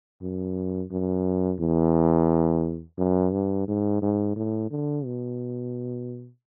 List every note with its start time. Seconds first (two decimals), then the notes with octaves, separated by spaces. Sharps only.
0.22 F#2
0.92 F#2
1.60 E2
2.98 F#2
3.33 G2
3.68 G#2
4.02 G#2
4.36 A2
4.71 D3
5.05 B2